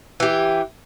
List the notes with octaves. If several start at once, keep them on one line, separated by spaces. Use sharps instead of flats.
E3 G4